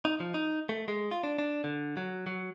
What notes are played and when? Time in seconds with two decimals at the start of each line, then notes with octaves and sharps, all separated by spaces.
0.05 D#4
0.20 F3
0.34 D#4
0.69 A3
0.88 G#3
1.11 F4
1.23 D4
1.39 D4
1.64 D3
1.97 F#3
2.27 F#3